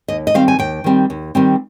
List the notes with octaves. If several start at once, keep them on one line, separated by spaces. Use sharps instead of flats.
D#2 D#5
D#5
D#3 G3 C4 F5
G#5
D#2 G5
D#3 G3 C4
D#2
D#3 G3 C4